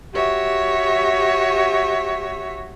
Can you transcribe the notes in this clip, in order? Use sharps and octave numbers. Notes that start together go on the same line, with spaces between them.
F#4 G4 C#5 E5